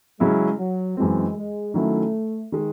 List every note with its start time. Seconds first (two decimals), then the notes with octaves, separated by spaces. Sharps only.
0.20 C#3 F#3 G#3 C#4 E4
0.58 F#3
0.97 F#2 E3 G#3 C4
1.35 G#3
1.74 D#3 F#3 A3 C#4 E4
2.52 D#3 G#3